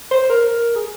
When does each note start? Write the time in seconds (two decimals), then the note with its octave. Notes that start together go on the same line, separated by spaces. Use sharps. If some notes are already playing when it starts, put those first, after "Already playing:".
0.11 C5
0.29 A#4
0.48 A#4
0.76 G#4